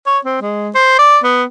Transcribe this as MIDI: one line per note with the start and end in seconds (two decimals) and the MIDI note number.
0.06 0.18 73
0.25 0.39 60
0.42 0.70 56
0.75 0.95 72
0.99 1.18 74
1.24 1.44 59